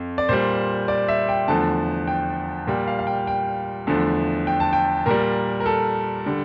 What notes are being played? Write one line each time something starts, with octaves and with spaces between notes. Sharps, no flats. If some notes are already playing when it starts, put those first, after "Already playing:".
Already playing: F2
D5
A#2 G3 C5
D5
E5
G5
E2 D3 F3 A3 A5
G5
A#2 G3 G5
F5
F5
G5
G5
E2 D3 F3 A3
G5
A5
G5
A#2 G3 A#4
A#4
A4
D3 G3